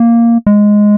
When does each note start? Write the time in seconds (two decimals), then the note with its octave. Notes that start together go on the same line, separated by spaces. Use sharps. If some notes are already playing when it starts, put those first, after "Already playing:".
Already playing: A#3
0.47 G#3